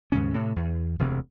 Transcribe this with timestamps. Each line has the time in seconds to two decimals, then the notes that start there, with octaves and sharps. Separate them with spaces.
0.12 D#2 G#2 C#3 C#4
0.34 A2 C3
0.56 E2
0.99 E1 D2 C3